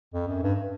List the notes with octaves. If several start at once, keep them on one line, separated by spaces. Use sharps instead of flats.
F2
F#2
G2